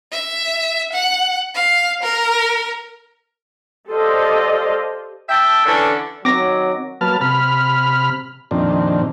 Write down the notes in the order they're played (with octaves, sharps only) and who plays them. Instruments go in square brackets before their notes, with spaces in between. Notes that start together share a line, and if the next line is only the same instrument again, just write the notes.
[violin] E5
F#5
F5
A#4
[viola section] G4 A4 C5 D5 D#5 F5
[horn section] E5 G5 A5
D3 E3 C#4 D4 A4
[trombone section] D#3 F#3 [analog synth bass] C4 [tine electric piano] D6 A#6
[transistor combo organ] F#3 A#3 B4 A5 F6
C3 B5 F6
F2 A#2 D#3 C4 D4